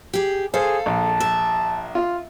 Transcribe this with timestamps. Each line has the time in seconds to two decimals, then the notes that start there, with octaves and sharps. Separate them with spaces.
0.14 G4 G#4
0.54 G#4 A4 C5 F5
0.86 A#1 A5
1.20 E5
1.95 F4